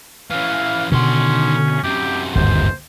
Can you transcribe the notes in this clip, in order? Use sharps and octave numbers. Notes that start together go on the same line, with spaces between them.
E3 C#4 F5
B2 D3 D#3 C#4 C6
F#2 C3 G4
G1 D#2 G#2 C5